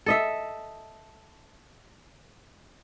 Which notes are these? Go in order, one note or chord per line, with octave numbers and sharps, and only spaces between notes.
A4 D#5 E5